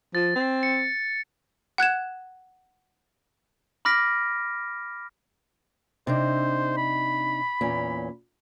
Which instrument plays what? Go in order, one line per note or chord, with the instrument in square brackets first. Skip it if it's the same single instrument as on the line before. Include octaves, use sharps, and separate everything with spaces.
[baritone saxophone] F3 [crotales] A6
[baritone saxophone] C4
[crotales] C#7
[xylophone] F#5 F#6 G#6 E7
[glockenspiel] B5 D6 F6 A#6 B6 D7
[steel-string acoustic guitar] C3 D4 D#4 [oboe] C5
[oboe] B5
[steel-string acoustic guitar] E2 A#2 C#4